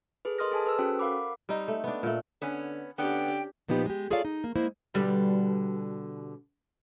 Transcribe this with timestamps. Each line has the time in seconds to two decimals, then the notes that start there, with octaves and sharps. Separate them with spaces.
0.25 G#4 A4 B4
0.38 A#4 D#5 C6 D#6 F6 A#6
0.51 G#4 A4 G#5 A5
0.65 A4 B4 E6
0.79 C#4 F#4 A4 C5 G5
0.99 A#4 F5 F#5 B5 D6
1.49 G3 C4 D#4
1.68 A3
1.84 B3 D4
2.03 A#2 A3
2.42 D3 B3 C#4
2.98 D3 B3 C#4 D4 G4 G5
3.68 A#2 F3 B3 D#4 G4 B4
3.86 G#3 G4
4.10 F4 G#4 A4 C#5 D5 F5
4.25 D#4
4.44 A#3
4.56 G#3 A#3 E4 C5
4.94 B2 D3 G3